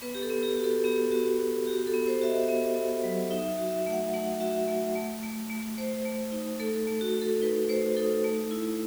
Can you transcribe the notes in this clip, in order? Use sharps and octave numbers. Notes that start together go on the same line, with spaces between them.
B3 B4
G4
A4
B3
G4
F#4
A4
B3 G4
B3 F#4
F#4
F#4 G4
A4
B3
C5
F#4 E5
D#5
B3
B3
F#3
D#4 E5
E5
F#4
E5
A3
F#5
A3 F#5
F#4 E5
A3
A3
A3
A3
A3 C5
A3
D#4
A3 A4
A3
F#4
F#4
A4
D#4 B4
A3 C5
D#4 A4
A3
E4